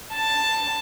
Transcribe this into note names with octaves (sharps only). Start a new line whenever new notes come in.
A5